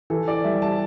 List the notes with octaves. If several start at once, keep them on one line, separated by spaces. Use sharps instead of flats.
E3 A4
D5
G3 E5
A5